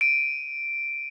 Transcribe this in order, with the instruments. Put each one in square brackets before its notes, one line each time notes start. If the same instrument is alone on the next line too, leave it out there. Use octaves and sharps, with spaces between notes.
[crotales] D7 D#7